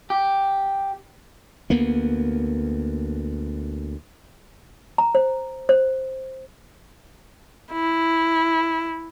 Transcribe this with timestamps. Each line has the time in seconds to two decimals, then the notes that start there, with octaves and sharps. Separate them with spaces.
0.10 G4
1.70 D2 A#3 B3
4.98 A#5
5.15 C5
5.69 C5
7.72 E4